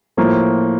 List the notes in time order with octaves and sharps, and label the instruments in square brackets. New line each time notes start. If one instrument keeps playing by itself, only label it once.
[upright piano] A2 F3 A#3